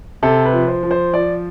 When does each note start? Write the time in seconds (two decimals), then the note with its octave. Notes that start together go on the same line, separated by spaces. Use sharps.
0.23 C3 A4
0.45 B4
0.53 F3
0.68 C5
0.83 F3
0.91 C5
1.13 F3 D5